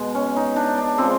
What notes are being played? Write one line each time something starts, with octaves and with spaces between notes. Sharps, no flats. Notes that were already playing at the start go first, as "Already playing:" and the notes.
Already playing: B2 G#3
C#4
D#4
D4
D4
C#3 F3 G#3 C4